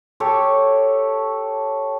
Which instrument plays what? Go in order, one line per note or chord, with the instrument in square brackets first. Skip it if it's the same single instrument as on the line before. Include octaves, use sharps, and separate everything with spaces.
[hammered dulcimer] G4 A4 C#5 C#6